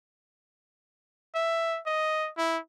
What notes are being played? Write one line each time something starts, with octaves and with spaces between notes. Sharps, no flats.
E5
D#5
E4